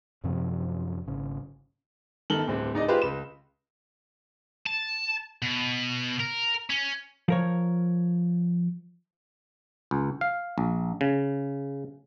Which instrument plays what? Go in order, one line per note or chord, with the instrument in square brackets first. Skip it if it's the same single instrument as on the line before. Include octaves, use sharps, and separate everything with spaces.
[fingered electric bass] F#2 C3 F3 C4
G#1 C#3
[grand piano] G1 D#3 A4 F#7 G7
D1 G2 C4
D1 D#4 D5 D#5
F4 G4 G#4 B4 C5
C#2 B5 E7
[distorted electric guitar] A5
B2
A#4
C#4
[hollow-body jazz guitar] F3 A#4 C#5
[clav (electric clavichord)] C#2
F5
A#1
C#3